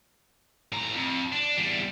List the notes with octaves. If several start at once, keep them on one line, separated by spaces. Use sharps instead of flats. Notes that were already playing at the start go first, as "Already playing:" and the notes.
A2 A#5
F2
D4
E2 G3